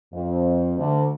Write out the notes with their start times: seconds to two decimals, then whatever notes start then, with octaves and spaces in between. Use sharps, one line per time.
0.14 F2
0.78 D2